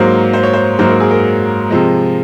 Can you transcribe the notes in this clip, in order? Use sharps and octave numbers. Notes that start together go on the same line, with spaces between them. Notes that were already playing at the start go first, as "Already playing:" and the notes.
Already playing: G#2 F#3 A#3 C5
C5
C#5
C5
G#2 F#3 A#3 C5
A#4
G#4
A#4
C3 F3 G#3